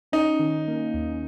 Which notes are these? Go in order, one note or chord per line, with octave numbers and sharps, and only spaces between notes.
C#4 D#4
D#3
A#3
D#2